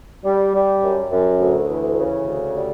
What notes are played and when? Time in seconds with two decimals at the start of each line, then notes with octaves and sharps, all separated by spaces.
0.25 G3
0.54 G3
0.83 F#2
1.11 F#2
1.40 D2
1.69 E3
1.98 C#3
2.26 D2
2.55 G3